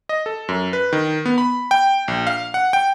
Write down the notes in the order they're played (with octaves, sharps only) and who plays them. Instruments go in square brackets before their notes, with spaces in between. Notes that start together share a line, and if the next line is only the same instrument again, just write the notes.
[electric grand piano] D#5
A4
F#2
B4
D#3
B3
B5
G5
A#1
F5
F#5
G5